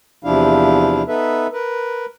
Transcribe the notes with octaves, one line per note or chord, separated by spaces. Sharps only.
E2 C3 F3 D4 E4 F5
B3 D#4 A4 B4 E5
A#4 B4